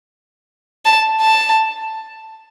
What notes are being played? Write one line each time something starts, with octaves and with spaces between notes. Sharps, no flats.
A5
A5